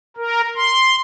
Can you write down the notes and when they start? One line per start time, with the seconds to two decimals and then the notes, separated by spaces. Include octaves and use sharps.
0.17 A#4
0.56 C6